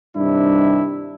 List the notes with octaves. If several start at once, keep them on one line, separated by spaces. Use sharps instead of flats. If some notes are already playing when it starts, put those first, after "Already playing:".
G2 C3 D#3 D4 E4